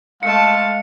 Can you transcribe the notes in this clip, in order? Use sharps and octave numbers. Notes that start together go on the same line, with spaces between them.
G#3 A3 F5 A5 C#7